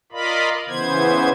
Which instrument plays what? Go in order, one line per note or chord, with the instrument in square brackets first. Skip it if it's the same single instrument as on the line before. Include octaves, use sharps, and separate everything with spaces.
[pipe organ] F4 A#4 D5 D#5 F5 B5
C#3 E3 B3 C5 G#6